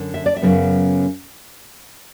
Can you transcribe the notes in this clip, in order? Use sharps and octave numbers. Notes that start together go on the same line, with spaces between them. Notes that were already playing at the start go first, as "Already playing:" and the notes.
Already playing: F#2 D3
E5
D5
E5
F#2 C#3 F#3 B3